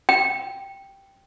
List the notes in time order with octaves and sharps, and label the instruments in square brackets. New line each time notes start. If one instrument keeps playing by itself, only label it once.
[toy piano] G5